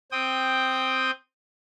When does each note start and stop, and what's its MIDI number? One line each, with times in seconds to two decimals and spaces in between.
0.12 1.11 60
0.12 1.11 79
0.12 1.11 87